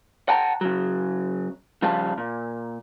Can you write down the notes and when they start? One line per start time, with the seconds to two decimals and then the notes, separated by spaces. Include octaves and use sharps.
0.29 F#5 G5 A5 A#5
0.61 C#3 F#3
1.82 C#3 F3 G3 F5 A5
2.18 A#2